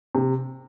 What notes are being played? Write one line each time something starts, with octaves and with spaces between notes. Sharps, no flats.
C3